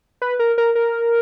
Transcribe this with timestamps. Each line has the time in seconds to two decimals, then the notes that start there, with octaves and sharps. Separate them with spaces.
0.22 B4
0.39 A#4
0.58 A#4
0.75 A#4